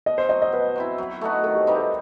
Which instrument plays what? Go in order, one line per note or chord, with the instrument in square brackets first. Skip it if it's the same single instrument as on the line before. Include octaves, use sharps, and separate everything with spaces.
[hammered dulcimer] B2 [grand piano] D#5
[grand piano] C5
[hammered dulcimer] F#3 C4 F#4 [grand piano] D#5
[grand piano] D#5
[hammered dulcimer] B2 [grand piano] B4
[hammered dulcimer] F#3 C4 E4
F#3
A3 D#4 F#4
[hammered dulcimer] D#3 [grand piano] A4
[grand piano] G4
C5
[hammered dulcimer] G3 C4 D#4 [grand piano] B4
[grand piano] A4